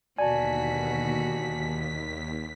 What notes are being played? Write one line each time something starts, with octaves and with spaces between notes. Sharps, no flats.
D#2 B2 D3 F#4 D5 G#5 A5 B6